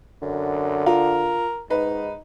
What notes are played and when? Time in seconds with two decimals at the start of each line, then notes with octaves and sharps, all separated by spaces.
0.22 F#2 D3
0.86 F4 A#4
1.70 G#2 D#4 B4